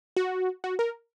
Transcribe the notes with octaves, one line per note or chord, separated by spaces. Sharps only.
F#4
F#4
A#4